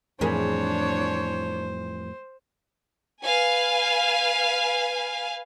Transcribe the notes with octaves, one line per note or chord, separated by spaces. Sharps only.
F2 A2 E3 D4 G#4 A#4 C5 C#5
B4 F5 G#5